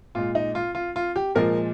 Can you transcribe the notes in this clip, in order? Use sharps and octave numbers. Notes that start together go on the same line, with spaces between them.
A#2 G#3 F4
D#4
F4
F4
F4
G4
A#2 F3 G#3 A#4